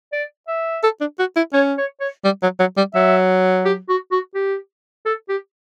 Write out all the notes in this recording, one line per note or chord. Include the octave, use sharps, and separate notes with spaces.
D5
E5
A4
D4
F#4
E4
C#4 C#5
C#5
C#5
G3
F#3
F#3
G3
F#3 E5
G4
F#4
F#4
G4
A4
G4